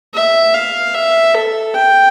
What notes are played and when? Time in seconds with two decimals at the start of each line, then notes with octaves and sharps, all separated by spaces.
0.14 E5
0.54 F5
0.94 E5
1.34 A4
1.75 G5